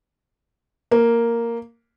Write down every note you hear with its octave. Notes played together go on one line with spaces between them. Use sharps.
A#3